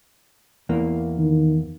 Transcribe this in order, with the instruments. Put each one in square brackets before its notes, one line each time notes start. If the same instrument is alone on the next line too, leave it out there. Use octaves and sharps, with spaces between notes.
[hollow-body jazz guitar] E2 E3 A#3
[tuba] D#3